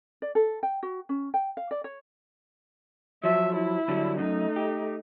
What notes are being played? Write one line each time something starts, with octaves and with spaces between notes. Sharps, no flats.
D5
A4
G5
F#4
C#4
G5
F5
D5
C#5
F3 F#3 E5
E4
D3 F#3 G3
F#2 A3 D#4
G4